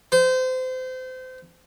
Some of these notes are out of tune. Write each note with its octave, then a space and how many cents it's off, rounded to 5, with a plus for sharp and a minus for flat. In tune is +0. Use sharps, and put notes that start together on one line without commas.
C5 -30